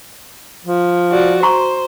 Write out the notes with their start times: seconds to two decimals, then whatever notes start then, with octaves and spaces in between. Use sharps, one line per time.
0.65 F3
1.11 F#4 D5
1.43 F#4 C5 A#5 C#6